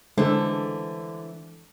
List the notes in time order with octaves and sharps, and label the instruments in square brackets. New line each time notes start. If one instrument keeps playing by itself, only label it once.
[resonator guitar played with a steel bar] D3 [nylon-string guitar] E3 A3 C5 [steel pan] G#3 A4